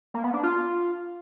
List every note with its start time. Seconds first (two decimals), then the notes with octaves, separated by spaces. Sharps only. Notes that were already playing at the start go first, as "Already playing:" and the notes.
0.14 A#3
0.24 B3
0.34 D4
0.43 F4